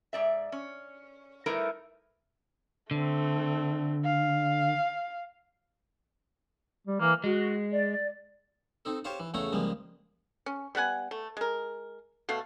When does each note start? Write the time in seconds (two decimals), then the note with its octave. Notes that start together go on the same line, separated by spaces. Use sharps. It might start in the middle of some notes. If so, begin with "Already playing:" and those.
0.13 G#2 D5 E5
0.52 C#4
1.46 G3 A3 D#4 E4 A#4 B4
2.91 D3 A3 C4
4.05 F5
6.87 G3
7.00 E3 A#3
7.24 G#3 F#4
7.71 D5
8.85 C4 D#4 A4
9.04 G4 C5 C#5 F5 A5
9.20 E3
9.34 E2 C#3 A3 A4 C#5 A#5
9.53 C#2 F3 G3 G#3 A#3
10.46 C#4
10.75 G3 B3 F#5 G#5
11.11 A3
11.37 G#3 A#4
12.29 B2 A3 F5